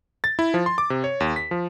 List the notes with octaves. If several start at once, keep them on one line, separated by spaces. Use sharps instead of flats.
A6
E4
F3
C6
D6
C3
C#5
D#2
B6
F3